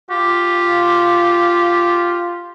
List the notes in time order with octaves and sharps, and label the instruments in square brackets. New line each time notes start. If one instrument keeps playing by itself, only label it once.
[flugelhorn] F4 [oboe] G4